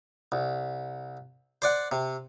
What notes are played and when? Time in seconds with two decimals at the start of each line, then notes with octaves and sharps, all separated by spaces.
0.32 C2
1.62 C5 D5 F#5
1.92 C3